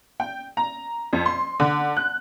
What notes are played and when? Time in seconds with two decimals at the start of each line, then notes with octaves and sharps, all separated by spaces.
0.20 G5
0.57 A#5
1.13 F2
1.26 C6
1.60 D3
1.97 F#6